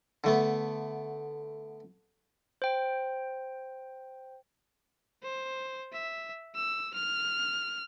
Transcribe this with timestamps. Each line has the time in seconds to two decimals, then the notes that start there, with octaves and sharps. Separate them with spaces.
0.24 D3 A3 B3
2.62 C5 G5
5.24 C5
5.93 E5
6.56 E6
6.94 F6